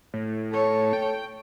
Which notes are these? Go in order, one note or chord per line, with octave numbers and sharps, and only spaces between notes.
A2
A4 C#5
G5